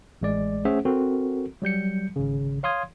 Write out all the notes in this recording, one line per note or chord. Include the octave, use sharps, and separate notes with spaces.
A1 G#3 D5
A3 C#4 G#4 C5 E5 F#5
C4 F#4 A4 A#4
F#3 G3 G6 C#7
G#1 C#3
C#5 F5 C6 D#6 G#6